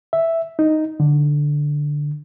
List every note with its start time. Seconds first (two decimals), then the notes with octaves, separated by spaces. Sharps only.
0.13 E5
0.59 D#4
1.00 D3